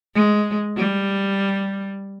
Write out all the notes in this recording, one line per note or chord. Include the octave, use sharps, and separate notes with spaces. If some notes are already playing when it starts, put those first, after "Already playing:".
G#3
G3